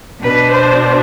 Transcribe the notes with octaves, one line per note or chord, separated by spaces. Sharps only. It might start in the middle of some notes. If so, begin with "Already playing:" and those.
B2 B3 D4 B4
C5